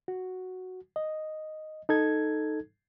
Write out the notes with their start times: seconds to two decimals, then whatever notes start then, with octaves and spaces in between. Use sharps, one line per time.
0.08 F#4
0.96 D#5
1.89 D#4 A4 G#6